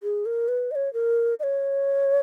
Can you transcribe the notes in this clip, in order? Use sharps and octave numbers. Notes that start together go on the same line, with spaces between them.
G#4
A#4
B4
D#5
C#5
A#4
D#5
C#5